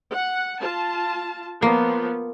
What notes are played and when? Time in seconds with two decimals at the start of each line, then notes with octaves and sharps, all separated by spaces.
0.12 F#5
0.61 F4 A5
1.62 F3 A#3 B3